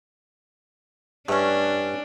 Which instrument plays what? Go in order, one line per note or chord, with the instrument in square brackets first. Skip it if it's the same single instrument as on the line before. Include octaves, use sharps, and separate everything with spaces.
[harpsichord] G2 [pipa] A3 C#4 [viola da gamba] D4